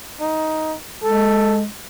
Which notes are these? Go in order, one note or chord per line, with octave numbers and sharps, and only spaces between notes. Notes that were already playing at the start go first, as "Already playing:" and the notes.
D#4
G#3 A4